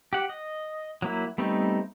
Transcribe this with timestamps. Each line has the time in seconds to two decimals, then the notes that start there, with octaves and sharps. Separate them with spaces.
0.13 G4 F#5
0.29 D#5
1.02 F#3 A#3 E4
1.38 G3 A3 B3 C4 D#4